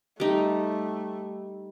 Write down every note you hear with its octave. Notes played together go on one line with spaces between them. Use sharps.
G3 A3 D#4